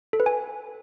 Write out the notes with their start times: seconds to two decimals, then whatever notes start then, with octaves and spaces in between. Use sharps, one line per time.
0.13 A4
0.20 B4
0.26 G#5